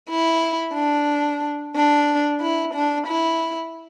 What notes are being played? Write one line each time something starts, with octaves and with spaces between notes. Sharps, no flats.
E4
D4
D4
E4
D4
E4